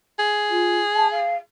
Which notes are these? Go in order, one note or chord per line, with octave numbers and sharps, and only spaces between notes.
G#4
F4
A5
F5